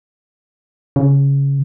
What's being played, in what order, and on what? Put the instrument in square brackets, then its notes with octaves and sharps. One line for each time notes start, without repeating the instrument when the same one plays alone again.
[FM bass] C#3